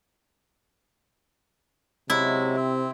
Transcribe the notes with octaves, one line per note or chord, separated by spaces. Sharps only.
C3 F#3 G#3 E4
C4